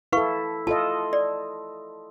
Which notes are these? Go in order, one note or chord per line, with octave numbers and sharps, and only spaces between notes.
E4 A4 B4 F5 C#6
F4 A4 D#5 A5
D5